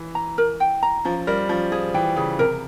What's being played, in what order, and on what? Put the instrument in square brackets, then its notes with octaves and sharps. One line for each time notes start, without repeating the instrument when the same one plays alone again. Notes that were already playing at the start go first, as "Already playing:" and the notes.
Already playing: [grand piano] E3
[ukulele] A#5
A#4
G5
A#5
[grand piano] F3 [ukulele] C#4
[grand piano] G3 [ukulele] A#4
[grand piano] F3 [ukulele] C#4
[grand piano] F3 [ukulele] G#4
[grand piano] E3 [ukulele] G5
[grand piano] C#3 [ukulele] G#4
[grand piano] C3 [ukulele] A#4